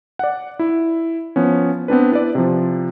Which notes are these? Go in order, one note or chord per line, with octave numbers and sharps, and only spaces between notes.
D5 F#5
E4
F3 B3 C#4
B3 C4 D4 B4
E4 B4 D5
C3 F3